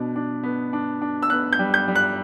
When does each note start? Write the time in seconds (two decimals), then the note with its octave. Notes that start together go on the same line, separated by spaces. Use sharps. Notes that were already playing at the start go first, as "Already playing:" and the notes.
Already playing: B2 D4
0.16 D4
0.43 B3
0.73 D4
1.02 D4
1.23 E6
1.30 B3 F#6
1.53 G6
1.59 G3
1.74 G6
1.88 G3
1.95 F#6